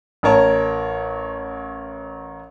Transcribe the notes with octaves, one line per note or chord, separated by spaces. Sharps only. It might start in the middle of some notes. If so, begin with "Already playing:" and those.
A1 A#4 C#5 A5